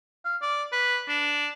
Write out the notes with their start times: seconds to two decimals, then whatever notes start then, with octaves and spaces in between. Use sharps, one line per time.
0.25 F5
0.42 D5
0.72 B4
1.09 D4